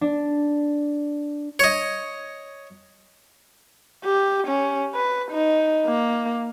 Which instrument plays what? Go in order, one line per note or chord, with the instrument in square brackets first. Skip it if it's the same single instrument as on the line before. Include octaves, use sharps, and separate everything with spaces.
[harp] D4
[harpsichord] C#5 D#5
[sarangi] G4
C#4
B4
D#4
A#3